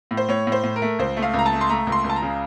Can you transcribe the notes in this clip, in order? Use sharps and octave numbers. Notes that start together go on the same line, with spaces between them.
A2
C5
A2 C#5
A2
C5
A2
A#4
A3
C#2 C5
A3
F5
C#2
A#5
A5
A3
C6
A3 A#5
C#2
C6
C#2
A5
A#5
C#3